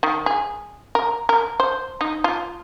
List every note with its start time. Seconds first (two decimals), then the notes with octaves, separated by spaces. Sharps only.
0.03 D#3
0.26 G#4
0.95 A#4
1.29 A#4
1.60 C5
2.01 D#4
2.24 F4